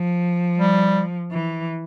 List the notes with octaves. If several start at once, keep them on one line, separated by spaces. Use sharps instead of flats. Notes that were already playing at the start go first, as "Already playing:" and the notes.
Already playing: F3
G3
E3